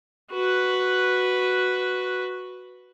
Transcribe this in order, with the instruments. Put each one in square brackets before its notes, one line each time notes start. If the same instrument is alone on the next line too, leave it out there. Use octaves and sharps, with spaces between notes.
[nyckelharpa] F#4 B4